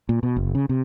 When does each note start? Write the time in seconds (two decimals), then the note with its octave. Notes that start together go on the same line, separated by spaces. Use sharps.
0.09 A#2
0.23 B2
0.36 F#1
0.55 C#3
0.69 C3